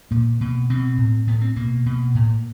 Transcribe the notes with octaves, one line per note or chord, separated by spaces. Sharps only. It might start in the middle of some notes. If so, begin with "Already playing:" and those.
A#2 A#3
B2
B2 C4
A2
A2 B3
C4
B2 A#3
B2
A2